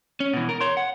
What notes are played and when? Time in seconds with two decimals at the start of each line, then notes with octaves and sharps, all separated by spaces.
0.20 C#4
0.33 B2 E3
0.49 A#4
0.61 C#5 C6
0.77 F#5